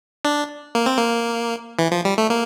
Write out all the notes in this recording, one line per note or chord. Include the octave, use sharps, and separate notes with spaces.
D4
A#3
C4
A#3
E3
F3
G3
A3
A#3